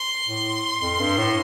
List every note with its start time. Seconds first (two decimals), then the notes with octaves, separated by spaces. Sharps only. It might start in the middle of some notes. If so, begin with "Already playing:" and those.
Already playing: C6
0.28 A2
0.82 F2
1.00 G2
1.18 A2